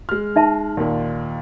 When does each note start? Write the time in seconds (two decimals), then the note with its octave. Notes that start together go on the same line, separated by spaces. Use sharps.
0.09 G#3 F6
0.36 D#4 E5 A5
0.77 D#2 A#2